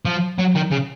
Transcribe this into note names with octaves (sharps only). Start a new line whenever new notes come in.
F3
F#3
D#3
C#3